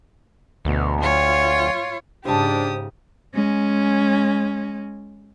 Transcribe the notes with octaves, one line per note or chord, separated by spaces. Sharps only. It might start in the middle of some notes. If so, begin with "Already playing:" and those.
D2 B2
F4 C#5
G#2 C#3 D4 G4 C5 A5 D#6
G#3 C#4